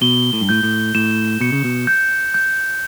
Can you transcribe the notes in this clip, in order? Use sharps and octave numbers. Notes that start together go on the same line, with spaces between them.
B2 G7
A2
G2
A2 G6
A2
A2 E7
B2 C#7
C#3
B2
G6
G6